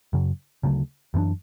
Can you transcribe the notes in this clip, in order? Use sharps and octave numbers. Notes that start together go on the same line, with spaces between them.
F#2 C#3 F#3
D2 C#3 F#3 A3
F#2 E3 B3 D4